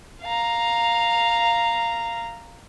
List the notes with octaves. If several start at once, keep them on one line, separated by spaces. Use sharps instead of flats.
F5 A#5